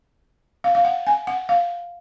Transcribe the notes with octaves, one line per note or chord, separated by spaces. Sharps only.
F5
F5
F#5
G#5
F#5
F5